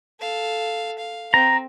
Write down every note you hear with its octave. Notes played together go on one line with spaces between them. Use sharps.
A4 F5
F5
C4 A#5